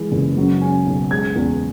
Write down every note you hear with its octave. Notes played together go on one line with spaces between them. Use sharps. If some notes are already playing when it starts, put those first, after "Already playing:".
Already playing: E3 G#3
F#1
F#3
C#4
B1
G#3 G#6
E2